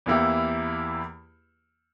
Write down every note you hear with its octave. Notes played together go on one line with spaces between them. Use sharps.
E2 E3 A#3 E4 G4